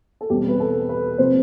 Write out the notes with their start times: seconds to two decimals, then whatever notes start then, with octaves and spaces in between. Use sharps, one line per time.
0.21 A4
0.30 E2 B2 G3 C4 G4
0.48 B4
0.60 A4
0.89 B4
1.18 C3 F3 C4 C5